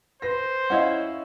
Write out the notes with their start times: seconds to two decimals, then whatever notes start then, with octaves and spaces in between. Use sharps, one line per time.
0.22 B4 C5 A#6
0.70 C#4 E4 C#5 D#5 F5 F#5